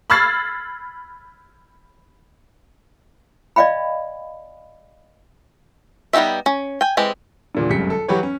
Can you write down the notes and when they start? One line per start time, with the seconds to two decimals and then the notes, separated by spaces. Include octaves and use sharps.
0.10 B5 E6 F6 G#6 A6 C7
3.56 D5 D#5 F5 G5 B5
6.13 G3 B3 D#4 G4 E5
6.46 C#4
6.81 G5 G#5
6.97 E3 G#3 C4 G4
7.55 E2 A#2 D3
7.70 G1 C#2 F#2 C3 B6 C#7
7.90 A4
8.08 E3 F#3 F#4 G4 B4 C#5
8.23 C#4